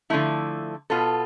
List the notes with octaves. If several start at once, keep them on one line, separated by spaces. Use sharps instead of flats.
D3 F3 A3 E4
B2 B3 F4 A4